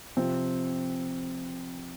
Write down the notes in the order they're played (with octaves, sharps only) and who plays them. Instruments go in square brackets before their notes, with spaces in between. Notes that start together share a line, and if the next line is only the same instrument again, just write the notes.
[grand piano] C3 F3 C4